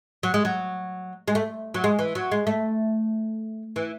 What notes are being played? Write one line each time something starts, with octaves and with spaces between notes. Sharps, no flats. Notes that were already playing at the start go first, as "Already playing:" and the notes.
F#3
G#3
F#3
G#3
A3
F#3
G#3
E3
F#3
G#3
A3
E3